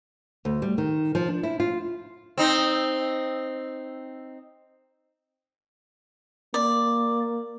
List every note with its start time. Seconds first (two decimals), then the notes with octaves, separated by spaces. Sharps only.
0.45 D2
0.62 G3
0.78 D#3
1.15 F3
1.28 D4
1.43 E4
1.60 F4
2.37 C4 D#4
6.54 A#3 D5